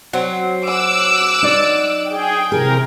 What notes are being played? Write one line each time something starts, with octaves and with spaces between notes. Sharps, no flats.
F#3 C4
D6 E6 F#6
D#4 D5
G#4 G5
C3 E3 G#4 A#4